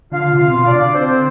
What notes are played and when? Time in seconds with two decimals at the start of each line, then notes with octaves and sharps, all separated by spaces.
0.11 D3 F4 F5
0.32 C3
0.39 F4 F5
0.48 C3
0.53 B2
0.66 D4 D5
0.73 D3
0.94 C4 C5